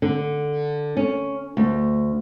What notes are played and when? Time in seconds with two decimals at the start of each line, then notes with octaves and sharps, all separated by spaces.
0.02 D3
0.97 C#4
1.57 D2